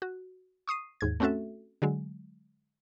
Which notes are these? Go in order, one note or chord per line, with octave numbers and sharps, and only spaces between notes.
F#4
C#6 D#6 C7 D#7
D#2 G#2 G#6
A3 C4 C#4 F#4 A4 E5
D3 F#3 G#3